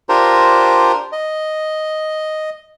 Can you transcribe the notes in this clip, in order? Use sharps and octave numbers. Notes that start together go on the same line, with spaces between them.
D4 F4 G4 A#4 C5 A#5
D#5